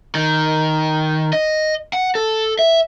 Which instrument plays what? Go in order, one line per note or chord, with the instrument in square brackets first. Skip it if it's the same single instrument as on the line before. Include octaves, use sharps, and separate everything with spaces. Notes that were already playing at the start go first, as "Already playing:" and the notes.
[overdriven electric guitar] D#3
D#5
F#5
A4
E5